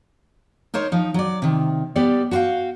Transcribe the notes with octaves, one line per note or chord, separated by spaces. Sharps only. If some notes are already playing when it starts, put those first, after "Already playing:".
D#4 A#4 C5 C#5
F3 D#4
F#3 D5
C3 D#3
G3 B3 G4 D5
F#4 B4 C5 F5 G5